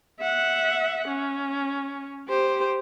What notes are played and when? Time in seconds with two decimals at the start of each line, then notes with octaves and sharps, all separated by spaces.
0.20 E5 F#5
1.08 C#4
2.29 G4 C5